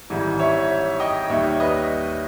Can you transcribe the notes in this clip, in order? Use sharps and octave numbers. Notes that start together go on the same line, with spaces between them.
G#1 G#2 E3 G3
C#5 E5
D#5 G5
D#2 D#3 G3 C#5 E5
B4 D#5